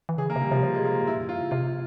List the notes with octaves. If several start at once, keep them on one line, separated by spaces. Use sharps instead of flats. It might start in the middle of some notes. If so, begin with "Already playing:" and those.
E3
C#3 G#4
E3 A#3
C3
C#3 G3
C3 F3
C#3 F3
C3 G#3
A#3
G#2
A#2 E4
F2
G2 F4
C#3
C3 F4